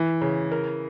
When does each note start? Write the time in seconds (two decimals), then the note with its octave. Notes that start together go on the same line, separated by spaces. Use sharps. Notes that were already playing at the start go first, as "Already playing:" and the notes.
Already playing: E3
0.21 C#3
0.52 A#4